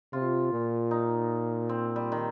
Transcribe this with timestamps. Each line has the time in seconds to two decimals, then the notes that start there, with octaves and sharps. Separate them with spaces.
0.13 C3 F4
0.52 A#2
0.91 D#4
1.69 C4
1.96 G3
2.12 D#3